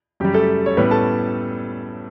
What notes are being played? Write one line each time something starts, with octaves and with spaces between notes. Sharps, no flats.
F#2 C#3 G3 G4
A3 A4
C#5
A2 G3 B3 C#4 B4
A4 A5